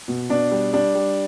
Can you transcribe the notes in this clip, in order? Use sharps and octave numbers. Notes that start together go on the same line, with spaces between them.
B2
B2 D4
G3
G3 D4
G3